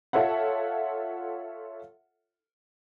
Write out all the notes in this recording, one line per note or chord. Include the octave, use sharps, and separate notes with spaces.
F4 A4 C#5 E5 F#5